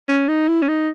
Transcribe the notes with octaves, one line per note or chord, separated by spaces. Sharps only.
C#4
D#4
E4
C#4
D#4